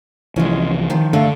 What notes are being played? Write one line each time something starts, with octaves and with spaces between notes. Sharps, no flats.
C2 E3 F3 G#3 C#4
D#3 F3
G2 D3 A3 F5